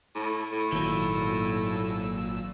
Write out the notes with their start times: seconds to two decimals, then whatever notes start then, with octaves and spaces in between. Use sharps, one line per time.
0.15 A2
0.52 A2
0.72 G#1 A#2 D#3 F#3 E6